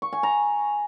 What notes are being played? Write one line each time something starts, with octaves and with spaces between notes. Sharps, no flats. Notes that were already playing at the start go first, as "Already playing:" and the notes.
C#6
G#5
A#5